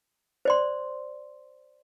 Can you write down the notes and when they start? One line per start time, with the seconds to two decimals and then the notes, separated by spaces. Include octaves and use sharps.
0.45 C5 D5 C6